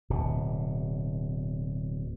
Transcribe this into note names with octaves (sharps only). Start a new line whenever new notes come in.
D1 B2